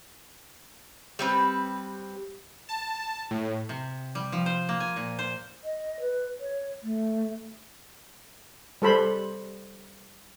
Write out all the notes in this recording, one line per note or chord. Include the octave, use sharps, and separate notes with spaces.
G3 C4 B4
A5
A2
C3
G3
F3
C5
A#3
G#5
A#2
C5
D#5
B4
C#5
A3
G3 A4 C5 B5